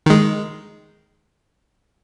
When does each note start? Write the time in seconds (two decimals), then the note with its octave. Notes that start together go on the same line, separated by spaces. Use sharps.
0.06 D#3 G#3